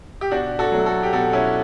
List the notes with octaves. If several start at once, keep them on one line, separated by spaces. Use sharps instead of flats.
G4
B2 D4 F#4
F#4 A4
F#3 A3
F#4 A4
G4
B2 F#4 A4
C#4 E4